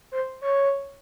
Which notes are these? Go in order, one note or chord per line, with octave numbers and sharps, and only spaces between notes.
C5
C#5